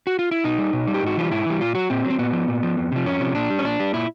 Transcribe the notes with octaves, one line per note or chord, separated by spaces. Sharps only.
F#4
F4
E4
B2 D#4
G3
B2
G3
G4
G#2 F#4
E3 G3 F4
G#2 E4
E3 G3
A#2 F4
F#3 F#4
A#2 C4
F#3
C4
A#2 B3
F3
A#2
F3
F2
C3 F3
F2 C#4
C3 F3
A#2 D4
G3
C#4
A#2 D4
G3
A#2 E4